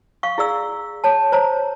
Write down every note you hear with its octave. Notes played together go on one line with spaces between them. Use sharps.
F5 C#6
E4 G#4 D5 E6
C#5 A5
C5 C#5 A#5